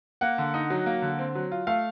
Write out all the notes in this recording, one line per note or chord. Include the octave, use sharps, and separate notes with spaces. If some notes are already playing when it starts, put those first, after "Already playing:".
A#3 F#5
D3
D#4
F#3
A#3
D3
C4
F#3
F4
A3 F5